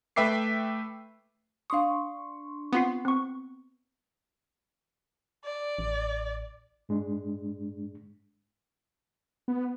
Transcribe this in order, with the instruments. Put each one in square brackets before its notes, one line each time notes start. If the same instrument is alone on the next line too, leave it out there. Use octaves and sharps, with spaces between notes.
[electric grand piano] A3 B4 E5 G5 D6 C7
[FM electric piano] D4 C6 C#6 [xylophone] F5 D#6
[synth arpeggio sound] B3 [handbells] C4 F4 C7
[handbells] C4 C#6
[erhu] D5
[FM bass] A1
[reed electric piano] G#2 G#3 D4
[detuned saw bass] B3